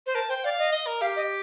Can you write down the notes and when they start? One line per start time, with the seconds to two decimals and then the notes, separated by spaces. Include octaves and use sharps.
0.06 C5
0.15 A#4 A5
0.29 C5 G5
0.44 D5 F5
0.58 D#5
0.72 D#5
0.87 A#4
1.01 G4 F5
1.16 D#5